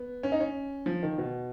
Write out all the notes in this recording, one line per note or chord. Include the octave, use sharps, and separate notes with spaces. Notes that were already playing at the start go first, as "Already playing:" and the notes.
Already playing: B3
C#4
D#4
C#4
F3
D#3
B2